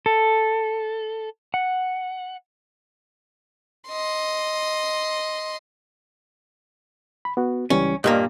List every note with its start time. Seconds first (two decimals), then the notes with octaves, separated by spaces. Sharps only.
0.06 A4
1.54 F#5
3.89 D#5 C6
7.25 B5
7.37 B3 F#4
7.70 C#2 E3 G3 C#4
8.04 G2 A#2 A#3 D#5